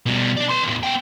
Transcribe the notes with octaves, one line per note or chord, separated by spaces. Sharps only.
B2 G3
D4 D5
B4 C6
E2 A2
B3 G5